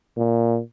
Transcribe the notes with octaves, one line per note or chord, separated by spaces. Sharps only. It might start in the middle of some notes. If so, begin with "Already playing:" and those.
A#2